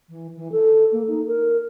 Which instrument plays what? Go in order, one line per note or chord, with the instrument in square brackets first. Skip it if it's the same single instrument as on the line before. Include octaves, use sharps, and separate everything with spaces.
[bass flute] E3
E3
A4
A#3
D#4
A#4